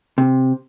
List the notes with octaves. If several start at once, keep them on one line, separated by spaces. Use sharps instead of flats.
C3